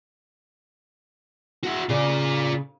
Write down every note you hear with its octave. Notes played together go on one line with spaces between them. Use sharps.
E4 F#4
C#3 F4 D5